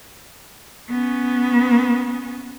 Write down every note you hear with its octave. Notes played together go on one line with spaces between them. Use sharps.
B3 C#4